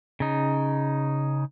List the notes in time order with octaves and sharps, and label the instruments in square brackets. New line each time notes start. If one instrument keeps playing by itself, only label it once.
[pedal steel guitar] C#3 D#4